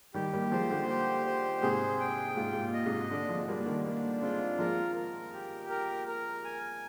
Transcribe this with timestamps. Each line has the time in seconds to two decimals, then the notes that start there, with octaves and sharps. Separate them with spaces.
0.14 D#3 G3 G4
0.33 G3 A#3
0.51 F3 G#3 C5
0.70 A#2 D3
0.89 G4
1.26 C5
1.62 G#2 C3 G#4
2.00 G5
2.37 G#2 F4
2.53 G#2
2.61 A#2
2.73 D#5
2.86 G#2 C3
3.10 A#2 D3 D4
3.29 F3 G#3
3.41 G#3
3.47 G3 A#3 D4
3.66 D#3 G3
3.84 G3 A#3 D4
4.22 G#3 C4 F4
4.59 F3 G#3 A#4
4.95 A#4
5.33 G4
5.70 A#4
6.08 A#4
6.45 G#5